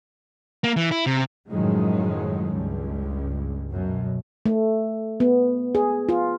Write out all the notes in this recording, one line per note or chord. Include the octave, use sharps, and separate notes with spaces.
A#3
E3
E4
C3
F#2 A2 D#3 F3 F#3 G#3
C#2 G2
F#2 B2
A3
B3
G#4
F4